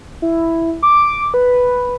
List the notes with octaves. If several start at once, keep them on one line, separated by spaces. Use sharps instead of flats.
E4
D6
B4